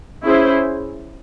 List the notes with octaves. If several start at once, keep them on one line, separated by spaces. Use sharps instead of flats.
C#4 E4 G#4 C5